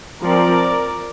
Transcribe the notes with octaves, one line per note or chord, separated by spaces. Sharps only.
F3 C4 A#4 D5